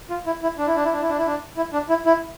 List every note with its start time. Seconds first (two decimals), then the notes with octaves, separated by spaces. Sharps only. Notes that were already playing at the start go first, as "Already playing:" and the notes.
0.10 F4
0.26 E4
0.43 E4
0.58 D4
0.67 E4
0.76 D4
0.85 E4
0.93 D4
1.01 E4
1.09 D4
1.18 E4
1.26 D4
1.57 E4
1.73 D4
1.89 E4
2.05 E4